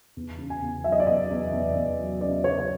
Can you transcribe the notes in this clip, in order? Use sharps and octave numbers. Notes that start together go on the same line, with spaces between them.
E2
C#3
G#5
E2
F#3 E5
D#5
D5
E2 D#5
E2
E2
E2
F#3
C#3 D5
F#3 C#5
C#5